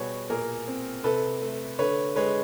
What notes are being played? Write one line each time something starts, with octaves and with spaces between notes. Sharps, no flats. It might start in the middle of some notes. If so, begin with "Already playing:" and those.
Already playing: B2 G3 F#4 G#4 B4 C#5
A#2 G#4 A#4
C4
C3 A4 B4
A3
D3 B4 C#5
G#3 B4 C#5